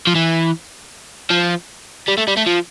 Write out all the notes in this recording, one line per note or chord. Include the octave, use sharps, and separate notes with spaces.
F3
E3
F3
G3
A3
G3
A3
F3